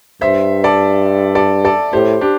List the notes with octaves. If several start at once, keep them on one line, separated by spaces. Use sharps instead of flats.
G2 C5 E5
A4 D5
A4 D5
A4 D5
A2 G4 C5
D4 G4